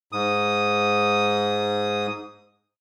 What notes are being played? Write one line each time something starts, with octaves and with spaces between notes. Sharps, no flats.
G#2 D#6